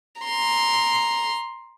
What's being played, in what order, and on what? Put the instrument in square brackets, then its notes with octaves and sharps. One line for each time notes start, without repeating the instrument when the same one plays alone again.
[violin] A#5 C6